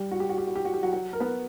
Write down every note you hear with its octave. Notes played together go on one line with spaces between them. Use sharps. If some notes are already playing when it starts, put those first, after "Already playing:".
Already playing: G3 G4
F#4
G4
F#4
G4
F#4
G4
F#4
G4
F#3 F#4
F#3 F#4
A#4
B3 B4